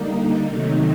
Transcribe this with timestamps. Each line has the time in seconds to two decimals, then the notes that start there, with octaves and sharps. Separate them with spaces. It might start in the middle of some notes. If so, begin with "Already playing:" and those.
Already playing: D3 G3 A#3 D#4
0.48 C3 D#3 F#3 A3 D#4